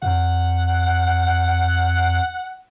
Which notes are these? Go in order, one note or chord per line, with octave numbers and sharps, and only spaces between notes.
F2 F#5